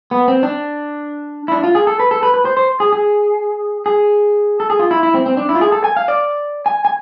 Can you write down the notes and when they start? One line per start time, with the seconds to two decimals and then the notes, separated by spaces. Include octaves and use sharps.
0.11 B3
0.28 C4
0.43 D4
1.48 E4
1.52 D4
1.64 F4
1.75 G#4
1.87 A4
2.00 B4
2.11 A4
2.23 B4
2.34 B4
2.45 C5
2.57 C5
2.80 G#4
2.93 G#4
3.86 G#4
4.60 A4
4.70 G#4
4.80 F4
4.91 E4
5.03 E4
5.14 C4
5.26 C4
5.37 D4
5.49 E4
5.55 F4
5.61 G#4
5.72 A4
5.84 G#5
5.97 F5
6.08 D5
6.66 G#5
6.85 G#5